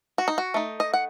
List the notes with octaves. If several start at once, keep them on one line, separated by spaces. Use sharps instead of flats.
F#4
D#4
F#4
A3 D#4
D#5
F#5